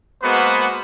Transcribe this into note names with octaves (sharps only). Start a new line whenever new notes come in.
G#3 A#3 B3 F#4 B4 C5